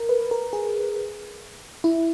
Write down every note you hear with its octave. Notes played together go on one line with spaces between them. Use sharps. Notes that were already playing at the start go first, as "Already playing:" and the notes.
Already playing: A#4
B4
A#4
G#4
E4